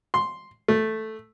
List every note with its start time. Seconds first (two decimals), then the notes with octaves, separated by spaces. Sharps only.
0.14 C6
0.68 A3